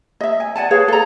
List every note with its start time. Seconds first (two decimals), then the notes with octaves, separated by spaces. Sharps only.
0.21 D#5 E5
0.40 G#5
0.56 D5 F#5 G#5 A5
0.71 G#4 B4 C#5 F5
0.88 A4 A#5